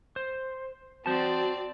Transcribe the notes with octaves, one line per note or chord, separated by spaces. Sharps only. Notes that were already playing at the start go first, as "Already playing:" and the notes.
C5
C4 F#4 C5 D5 A5